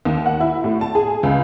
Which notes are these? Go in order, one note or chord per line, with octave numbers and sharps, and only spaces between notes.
D#2
F#5
E4
A2
A5
G#4
C#2